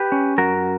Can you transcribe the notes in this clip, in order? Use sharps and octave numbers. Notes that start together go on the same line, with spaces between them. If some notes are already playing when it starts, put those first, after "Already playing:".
Already playing: G4 B4
C#4
F#2 F#4 A#4